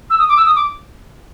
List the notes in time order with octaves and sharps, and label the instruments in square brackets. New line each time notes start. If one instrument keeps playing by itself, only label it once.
[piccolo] E6
D#6
D6
E6
D#6
D6